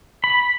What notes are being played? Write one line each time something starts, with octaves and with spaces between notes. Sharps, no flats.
B5